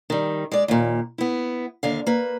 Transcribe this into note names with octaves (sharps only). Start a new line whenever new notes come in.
D#3 G3
G#3 D5
D#2 A#2
B3 E4
D#2 D3 F5
A#3 B4